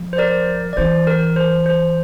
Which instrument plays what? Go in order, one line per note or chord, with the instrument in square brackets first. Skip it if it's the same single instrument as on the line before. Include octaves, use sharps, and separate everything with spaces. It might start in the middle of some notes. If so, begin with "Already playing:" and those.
Already playing: [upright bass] F3
[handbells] C5
A#4 D5
D5
[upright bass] E3 [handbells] C5
[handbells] A#4
C5
C5